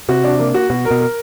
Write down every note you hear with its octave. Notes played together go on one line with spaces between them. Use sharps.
C3 F#4
D4
A#3
F#4
B2 F#4
A#4
B2
A#4